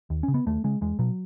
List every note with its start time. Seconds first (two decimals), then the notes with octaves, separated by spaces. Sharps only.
0.10 D#2
0.23 C#3 C#4
0.34 B3
0.46 D#2 A3
0.64 C#3 G#3
0.81 E2 G#3
0.99 B2 F#3